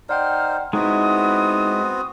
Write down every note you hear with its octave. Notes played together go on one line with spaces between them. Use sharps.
D#4 C5 D5 F#5 G5 F6
G#3 B3 C4 D#4 E4 F#4 D#6